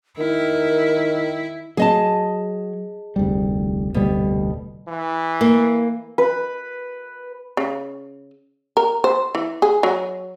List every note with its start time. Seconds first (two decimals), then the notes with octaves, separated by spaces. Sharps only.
0.18 D#3 E4 A#4
1.77 F#3 G#4 D#5 A5
3.16 F1 D2 G3
3.94 F1 D2 B2 G3
4.88 E3
5.41 A#3
6.18 B4
7.57 C#3
8.77 A#4
9.04 C5
9.35 E3
9.62 G#4
9.83 F#3